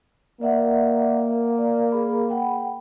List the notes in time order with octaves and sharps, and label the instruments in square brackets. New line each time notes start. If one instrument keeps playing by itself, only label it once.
[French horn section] A#3 [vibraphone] D5 E5 F#5
[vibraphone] D5
G#4 B5
F#5 G5 B5